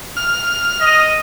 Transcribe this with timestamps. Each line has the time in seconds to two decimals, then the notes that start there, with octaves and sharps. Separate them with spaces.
0.17 F6
0.81 D#5